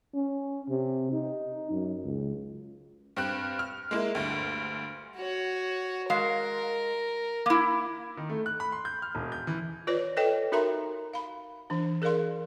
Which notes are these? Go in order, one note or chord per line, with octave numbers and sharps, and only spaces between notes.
C#4
C3
D#4
F#2
C#2
G2 C4 F#6
F6
G#3 A#3 E4
D2 G2
F#4 C#5
G#3 A#4 F5
A#3 E4
D#3
A3
F#6
B5
C6
G6
F6
E1
G6
E3
F4 B4 C#5 D5
A4 B4 C#5 D#5 G5
D#4 F#4 A#4 E5 A#5 C6
F5 B5
E3 D4
G#4 A#4 D5 F5 C6